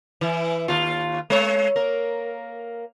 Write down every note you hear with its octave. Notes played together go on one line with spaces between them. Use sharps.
E3 E4
D#2 F4
G#3 C#5
A#3 A#4